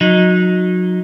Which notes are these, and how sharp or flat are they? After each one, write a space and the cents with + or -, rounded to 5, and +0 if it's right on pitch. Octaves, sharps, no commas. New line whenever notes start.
F#3 -25 D#4 +0